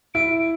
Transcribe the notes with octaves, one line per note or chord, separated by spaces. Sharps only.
E4 D7